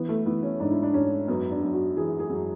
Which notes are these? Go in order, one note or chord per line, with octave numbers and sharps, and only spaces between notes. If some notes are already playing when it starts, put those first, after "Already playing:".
Already playing: E3 B3
A3
E3 B3
C#4
G#2 D4
E4
D4
G#2 C#4
F#2 B3
D4
F#2
F#4
E3 G#4
G#4
F#2